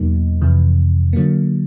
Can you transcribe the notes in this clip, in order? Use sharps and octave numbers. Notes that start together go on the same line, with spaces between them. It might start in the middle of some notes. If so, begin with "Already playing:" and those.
Already playing: E2 B2 F#3 A#3 D#4
F2 C3 E3
D3 F#3 A#3